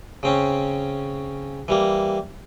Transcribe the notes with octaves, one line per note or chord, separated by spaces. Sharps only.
C#3 C4 C#4
E3 G3 A#3